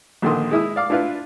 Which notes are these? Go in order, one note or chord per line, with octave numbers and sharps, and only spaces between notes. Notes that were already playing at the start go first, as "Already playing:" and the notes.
A#1 A#2 D3 D#3 C6 D#6
G#3 E4 D#6
D5 F5 D6
D4 E4 F4 B4 F5